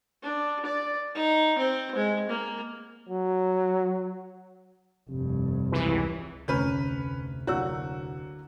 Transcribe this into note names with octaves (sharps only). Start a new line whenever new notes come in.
D4
D5
D#4
C4
G#3
A#3
F#3
F1 G2 C3
C#2 E3
F1 D2 C#4 B4 A#5 F6 G6
D3 F#3 A#3 E4 F#4 C#5 E6